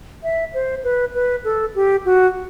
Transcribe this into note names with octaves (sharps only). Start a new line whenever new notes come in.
E5
C5
B4
B4
A4
G4
F#4